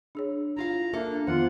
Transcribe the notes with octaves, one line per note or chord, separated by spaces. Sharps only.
D4 G#4 C#5
E4 F4 F5 A#5
A#3 D4 A4 E5
F2 D#3 B3 F4 F#5